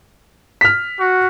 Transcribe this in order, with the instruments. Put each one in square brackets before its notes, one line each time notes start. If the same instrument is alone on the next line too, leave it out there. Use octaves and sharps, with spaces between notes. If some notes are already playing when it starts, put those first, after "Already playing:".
[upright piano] F6 B6
[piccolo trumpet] F#4